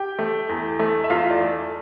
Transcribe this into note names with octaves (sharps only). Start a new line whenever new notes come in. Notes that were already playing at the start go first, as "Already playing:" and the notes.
Already playing: G4 G5
A3
E2
A3
E5
E2 F4 F5
D5
A3